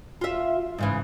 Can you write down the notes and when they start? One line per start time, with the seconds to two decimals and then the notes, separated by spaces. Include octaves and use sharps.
0.21 F4 E5
0.78 G#2 C#3 E3